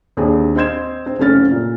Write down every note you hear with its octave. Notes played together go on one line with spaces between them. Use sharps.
D#2 C4 D4 G#4
C4 D#5 C6 G6 G#6 E7
C4
F#1 C3 A3 C#4 F6 A6
A#2